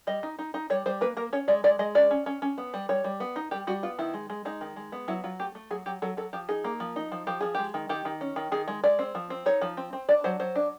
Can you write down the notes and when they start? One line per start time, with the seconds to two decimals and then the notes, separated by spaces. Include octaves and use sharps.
0.07 G3 D#5
0.23 D#4
0.39 D#4
0.54 D#4
0.70 G3 C#5
0.86 G3 C5
1.01 A#3 B4
1.17 A#3 A#4
1.33 C#4 C#5
1.48 G#3 D5
1.64 G#3 D5
1.79 G#3 D#5
1.95 C#4 D5
2.11 C#4
2.26 C#4
2.42 C#4
2.58 B3
2.74 G3
2.89 G3 C#5
3.04 G3
3.20 B3
3.36 D#4
3.51 G3 G4
3.67 G3 F#4
3.83 B3 F4
3.99 D#3 E4
4.14 G#3
4.30 G#3
4.45 G#3 D#4
4.61 D#3
4.76 G#3
4.92 B3
5.08 F#3 E4
5.24 F#3 F4
5.39 A3 G4
5.55 A3
5.71 F#3 G#4
5.86 F#3 G4
6.02 F#3 A4
6.17 F#3 A4
6.33 F3 G4
6.49 D#4 G#4
6.64 A#3
6.80 F3
6.96 D#4
7.12 F3
7.27 F3 G4
7.41 F3 G#4
7.55 G#3 G4
7.74 D#3
7.89 D#3 G4
8.05 D#3
8.21 C#4
8.36 D#3
8.52 D#3 G#4
8.68 G#3
8.84 G#3 D5
8.99 C4
9.15 F3
9.30 C4
9.46 D#4 C#5
9.61 F3
9.77 C4
9.93 C4
10.09 D4 D5
10.24 F#3 C5
10.40 F#3 C5
10.56 D4